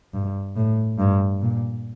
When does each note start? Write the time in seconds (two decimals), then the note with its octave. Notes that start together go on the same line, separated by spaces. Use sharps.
0.14 G2
0.56 A2
0.99 G2
1.42 A#2